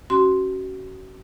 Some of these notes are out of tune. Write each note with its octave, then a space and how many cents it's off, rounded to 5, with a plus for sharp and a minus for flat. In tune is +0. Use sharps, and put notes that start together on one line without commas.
C#4 +0 F#4 +30 C6 +0